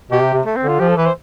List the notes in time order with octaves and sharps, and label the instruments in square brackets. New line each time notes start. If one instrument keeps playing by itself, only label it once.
[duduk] B2 [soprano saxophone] G4
[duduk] C3
C3
[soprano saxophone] A3
C4
[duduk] D3
[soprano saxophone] F4
[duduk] F3 [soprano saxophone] G4
[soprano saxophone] A4
[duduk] E3 [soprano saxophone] B4
[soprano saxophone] C5